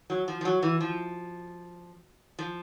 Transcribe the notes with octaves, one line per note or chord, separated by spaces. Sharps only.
F#3
F3
F3
F#3
E3
F3
F3